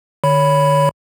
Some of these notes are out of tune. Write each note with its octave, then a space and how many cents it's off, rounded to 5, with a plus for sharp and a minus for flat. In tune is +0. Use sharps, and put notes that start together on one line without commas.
D3 +40 C#5 +15 B5 +0